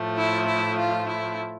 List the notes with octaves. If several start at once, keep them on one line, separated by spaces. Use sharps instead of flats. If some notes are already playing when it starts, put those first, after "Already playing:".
Already playing: A2 F3 A3
E4
E4
F4
E4